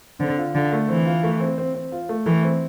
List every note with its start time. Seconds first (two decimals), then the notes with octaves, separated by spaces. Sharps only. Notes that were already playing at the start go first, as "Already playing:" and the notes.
0.20 D3 C4
0.37 F4
0.55 D3 F4
0.72 A3
0.89 E3 C4
1.06 F4
1.23 A3
1.40 C4
1.58 C4
1.75 C4
1.92 F4
2.09 A3
2.26 E3 A3
2.43 C4